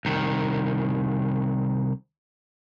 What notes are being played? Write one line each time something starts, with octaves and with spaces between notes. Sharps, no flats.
C2 D#3